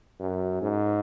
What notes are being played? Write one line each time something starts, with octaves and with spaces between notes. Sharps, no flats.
F#2
G#2